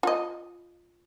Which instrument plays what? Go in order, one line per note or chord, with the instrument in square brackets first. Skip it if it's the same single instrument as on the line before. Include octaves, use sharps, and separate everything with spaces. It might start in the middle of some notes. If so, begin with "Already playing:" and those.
[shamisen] F4 D#5